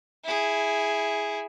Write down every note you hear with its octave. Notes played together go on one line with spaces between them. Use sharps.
E4 G#4